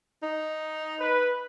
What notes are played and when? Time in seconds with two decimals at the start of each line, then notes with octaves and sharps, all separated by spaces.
0.23 D#4
0.98 B4